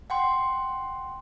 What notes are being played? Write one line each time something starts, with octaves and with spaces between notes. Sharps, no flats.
F#5 G5 C6